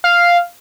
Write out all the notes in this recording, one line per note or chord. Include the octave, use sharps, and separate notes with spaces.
F5